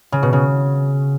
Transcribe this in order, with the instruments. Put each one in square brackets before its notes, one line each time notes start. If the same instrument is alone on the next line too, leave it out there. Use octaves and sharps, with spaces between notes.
[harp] C#3
B2
C#3